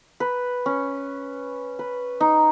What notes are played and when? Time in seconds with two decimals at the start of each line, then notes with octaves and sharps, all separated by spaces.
0.20 B4
0.66 C#4
1.79 B4
2.20 D#4